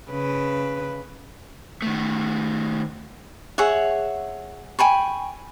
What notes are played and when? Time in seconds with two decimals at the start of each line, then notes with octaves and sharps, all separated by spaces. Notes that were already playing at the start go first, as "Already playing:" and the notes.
0.11 C#3 B4
1.82 D#3 A3
3.58 G#4 C#5 E5 F#5
4.79 G5 G#5 B5 C#6